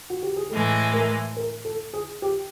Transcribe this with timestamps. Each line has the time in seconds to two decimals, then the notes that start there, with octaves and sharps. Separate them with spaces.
0.10 F#4
0.23 G4
0.36 G#4
0.49 A2 E3 G#3 A4
0.93 A#4
1.37 A#4
1.65 A4
1.93 G#4
2.22 G4